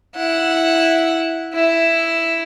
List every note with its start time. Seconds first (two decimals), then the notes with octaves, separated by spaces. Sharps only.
0.15 E4 F#5
1.54 E4 E5